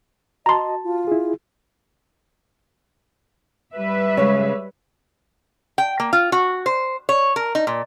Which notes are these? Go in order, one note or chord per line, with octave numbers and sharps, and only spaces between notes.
F#4 D#5 A5 A#5 C6
F4
E4 G#4
G3 B4 E5
C#3 G#3 C#5
G5
A#3
F4
F#4
C5
C#5
A#4
D#4
A#2